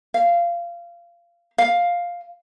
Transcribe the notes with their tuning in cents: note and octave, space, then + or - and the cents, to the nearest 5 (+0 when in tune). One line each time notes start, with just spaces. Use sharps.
F5 -20
F5 +5